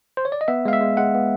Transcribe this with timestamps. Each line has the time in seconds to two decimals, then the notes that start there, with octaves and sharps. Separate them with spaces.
0.17 C5
0.25 C#5
0.32 D5
0.41 D#5
0.48 B3 E5
0.65 G#3 F5
0.73 E5
0.81 G#3
0.97 G#3 F#5
1.15 B3